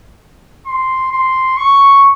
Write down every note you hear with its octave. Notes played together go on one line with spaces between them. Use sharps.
C6
C6
C#6